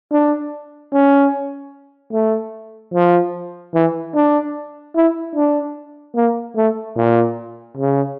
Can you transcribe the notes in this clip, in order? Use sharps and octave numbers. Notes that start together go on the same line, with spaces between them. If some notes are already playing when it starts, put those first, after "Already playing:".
D4
C#4
A3
F3
E3
D4
E4
D4
A#3
A3
A#2
C#3